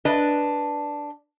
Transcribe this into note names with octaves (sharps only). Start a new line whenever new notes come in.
D4 B4 D#5